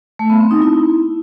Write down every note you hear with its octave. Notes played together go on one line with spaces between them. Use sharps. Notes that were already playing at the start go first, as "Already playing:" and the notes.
A3
B3
C4
D#4
E4